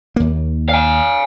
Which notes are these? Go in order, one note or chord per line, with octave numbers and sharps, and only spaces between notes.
D#2 A#3
F5 G#5